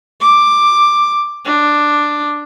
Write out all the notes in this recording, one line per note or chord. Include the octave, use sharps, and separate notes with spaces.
D6
D4